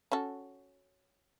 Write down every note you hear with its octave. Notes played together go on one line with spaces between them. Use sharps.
C#4 F#4 A4